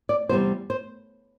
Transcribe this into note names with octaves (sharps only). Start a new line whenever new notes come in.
D5
E2 C3 G3 C4 C5
C5